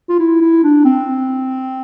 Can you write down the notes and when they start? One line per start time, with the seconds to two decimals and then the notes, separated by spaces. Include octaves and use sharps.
0.09 F4
0.19 E4
0.41 E4
0.63 D4
0.85 C4